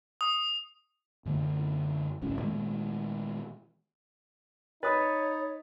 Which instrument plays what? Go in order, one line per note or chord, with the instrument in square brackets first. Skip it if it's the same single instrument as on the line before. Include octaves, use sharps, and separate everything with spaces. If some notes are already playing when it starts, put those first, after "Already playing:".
[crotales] D#6
[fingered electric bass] F#2 D3 A3
D1 B1 A2 C#4
A#2 D#3 G#3 A3
[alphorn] D#4 [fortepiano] B4 [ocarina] C#5 [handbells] B5 D#6 A6